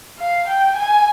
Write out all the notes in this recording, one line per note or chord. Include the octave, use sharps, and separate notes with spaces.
F5
G5
G#5